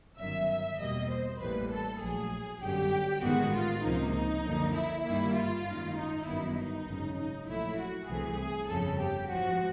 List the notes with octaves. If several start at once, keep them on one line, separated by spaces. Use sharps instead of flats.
G1 F#2 D#3 F#3 E5
E5
E2 B2 G3 A#3 D#5
C5
A1 A2 E3 G3 A#3 B4
A4
A#1 A2 F#3 G#4
G1 F#2 D3 F#3 G4
A1 G#2 D#3 G#3 B3 F#4
F4
C#2 C3 F3 A#3 D#4
D#4
F#2 D3 F3 A#3
E4
G2 D#3 G3 A#3 E4
F4
G#1 F#2 D#3
D#4
G1 F#2 D#3 F#3 B3 E4
D#4
G#1 F#2 C#3 F#3
D#4
A#1 A#2 F#3 A3 E4
F#4
C2 C3 E3 A3 G#4
G#4
G1 F2 C#3 F3 A4
G4
G#1 G#2 F3 F#4